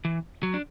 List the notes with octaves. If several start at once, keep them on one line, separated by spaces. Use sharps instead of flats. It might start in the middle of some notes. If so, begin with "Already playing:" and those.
E3
F#3
D4